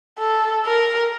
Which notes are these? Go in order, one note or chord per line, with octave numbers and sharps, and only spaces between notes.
A4
A#4